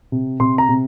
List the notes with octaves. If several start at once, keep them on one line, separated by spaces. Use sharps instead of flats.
C3
C3 C6
A#5
C3